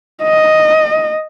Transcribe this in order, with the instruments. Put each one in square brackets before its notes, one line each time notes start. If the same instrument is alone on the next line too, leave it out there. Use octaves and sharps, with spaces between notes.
[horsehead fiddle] D#5